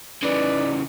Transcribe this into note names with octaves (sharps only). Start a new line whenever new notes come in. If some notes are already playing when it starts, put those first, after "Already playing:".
C#3 E3 D#4 B4 D5